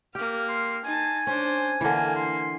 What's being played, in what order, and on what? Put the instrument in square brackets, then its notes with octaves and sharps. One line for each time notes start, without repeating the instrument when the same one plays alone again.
[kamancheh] A#3 F6 [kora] G4
[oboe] C6
[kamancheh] D#4 A5 [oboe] G#5
[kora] C#4 [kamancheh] D4 C5
[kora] D3 E3 [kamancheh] A#3
[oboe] C6